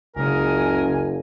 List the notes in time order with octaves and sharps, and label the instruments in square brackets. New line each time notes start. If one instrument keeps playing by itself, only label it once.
[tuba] F#1 [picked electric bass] C#2 C#3 [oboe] A#4 [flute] G#5